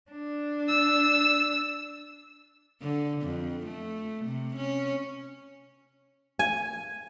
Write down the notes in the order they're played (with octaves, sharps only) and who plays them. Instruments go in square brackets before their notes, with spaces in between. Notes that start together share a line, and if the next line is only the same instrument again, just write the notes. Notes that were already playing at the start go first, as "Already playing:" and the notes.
[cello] D4
[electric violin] E6
[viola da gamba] D3
F2
A3
C3
C#4
[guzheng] G#5